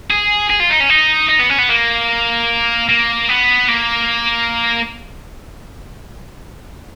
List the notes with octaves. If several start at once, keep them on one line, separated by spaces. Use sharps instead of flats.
G#4
G#4
F4
D#4
C#4
D#4
D#4
B3
C#4
B3
A#3
A#3
B3
A#3